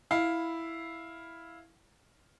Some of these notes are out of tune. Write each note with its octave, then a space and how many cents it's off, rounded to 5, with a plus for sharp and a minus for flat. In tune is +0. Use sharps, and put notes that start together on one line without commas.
E4 +0 F5 +0